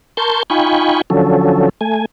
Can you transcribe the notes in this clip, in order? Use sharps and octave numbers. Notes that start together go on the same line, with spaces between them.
A#4 A5 C6 C#6 G6
D#4 F4 G5 G#5 B5 C#6
D3 F3 F#3 C#4 A4
A3 G#5